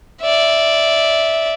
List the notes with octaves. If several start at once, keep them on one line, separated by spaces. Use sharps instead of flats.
D5 E5